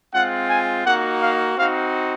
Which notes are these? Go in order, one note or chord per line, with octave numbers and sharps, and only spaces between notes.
G#3 C4 F4 F#5
G#5
A#3 D#4 F#4 F#5
F5
C4 D#4 F#4 F5